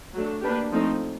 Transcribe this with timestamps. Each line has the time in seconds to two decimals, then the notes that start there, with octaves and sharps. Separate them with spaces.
0.14 F#3 A3 D4
0.43 A#3 D4 G4 B4
0.72 F3 A3 C4 D#4